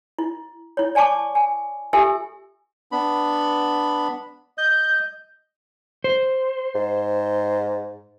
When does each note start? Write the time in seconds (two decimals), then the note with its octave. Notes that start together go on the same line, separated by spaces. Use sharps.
0.19 E4
0.77 E4 C#5
0.95 D5 G#5 A5 C#6 D6
1.35 G#5
1.93 F4 G4 A4 E5 G#5 E6
2.92 B3 D4 B5
4.58 D#5 G6
6.04 C5
6.75 G#2